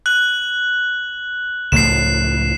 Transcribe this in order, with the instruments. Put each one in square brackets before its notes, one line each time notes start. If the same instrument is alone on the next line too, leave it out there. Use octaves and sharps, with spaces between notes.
[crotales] F#6 F#7
[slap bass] C#2 A2 F3 [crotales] C7 E7